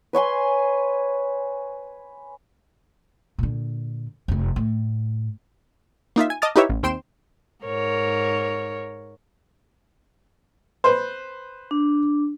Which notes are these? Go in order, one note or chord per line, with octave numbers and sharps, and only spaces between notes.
B4 C#5 G#5 C6
A#2 D3
F1 F2
A2
A#3 D#4 F4 E5
G#5
D#5 A5 D6 D#6 F6 A6
D#4 E4 G4 B4 C#5 E5
A1
D#2 C4 G5 C6 D7 E7
G#2 A#4 C#5
B4 C5
D4